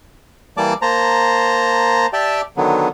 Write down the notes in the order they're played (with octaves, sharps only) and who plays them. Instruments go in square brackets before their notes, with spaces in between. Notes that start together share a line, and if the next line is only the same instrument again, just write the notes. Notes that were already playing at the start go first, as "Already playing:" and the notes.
[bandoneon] E3 G3 A#3 D5 A5 D6
A#3 C5 A5 A#5
G4 D5 E5 G5 A5
D3 D#3 F#3 B3